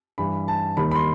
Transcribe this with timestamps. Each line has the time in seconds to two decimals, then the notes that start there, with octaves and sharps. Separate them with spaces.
0.18 G2 E3 G3 B5
0.48 A5
0.77 D#2 D#3 G3 B5
0.92 B5
0.95 C6